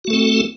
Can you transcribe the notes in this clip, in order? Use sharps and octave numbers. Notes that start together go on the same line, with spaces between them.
A3 C4 F#4 A4